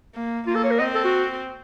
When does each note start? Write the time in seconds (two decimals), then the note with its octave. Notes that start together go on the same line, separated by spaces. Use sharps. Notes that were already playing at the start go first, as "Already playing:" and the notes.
0.15 A#3
0.47 A#3 F4
0.55 A4
0.64 C#5
0.71 A#4
0.79 C4 D#5
0.95 A4
1.04 F#4